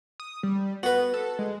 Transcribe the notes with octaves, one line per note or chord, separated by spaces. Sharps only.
D#6
G3
B3 F#4 B4
A4
G#3